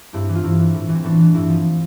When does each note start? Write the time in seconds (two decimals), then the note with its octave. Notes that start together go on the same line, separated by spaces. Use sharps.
0.13 G2 C4 E4
0.29 E3
0.35 F4
0.44 G2 C4 E4
0.60 E3
0.74 A2
0.89 E3
0.95 C4
1.04 A2 B3 D4
1.19 E3
1.34 G2 C4 E4
1.49 F3